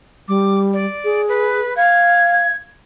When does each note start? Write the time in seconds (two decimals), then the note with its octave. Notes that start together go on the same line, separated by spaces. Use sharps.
0.28 G3 D6
0.73 D5
1.04 G#4
1.28 B4
1.77 F5 G#6